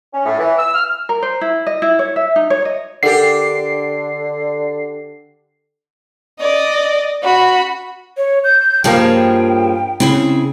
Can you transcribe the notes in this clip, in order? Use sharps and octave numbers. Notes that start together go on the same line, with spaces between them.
C#4
A2
E3
E6
F6
A#4
C5
E4
D#5
E4
C#5
E5
D#4
C#5
D#5
D3 D4 G4 A4 A#4 F#5 C7
D5 D#5
F#4 B5
C#5
G6
G2 F3 A#3 G#4 C#5 G5 A5
C#3 C4 E4 G#4